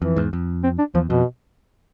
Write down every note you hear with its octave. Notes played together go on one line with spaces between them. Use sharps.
F2 E3
E2 G#2
F2
C4
D4
E2 F3
F2 B2